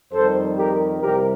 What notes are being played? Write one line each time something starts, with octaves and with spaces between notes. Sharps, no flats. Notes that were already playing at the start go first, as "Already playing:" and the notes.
F2 D#3 G3 A4 C5
G4 A#4
C2 C3 G3 G4 A#4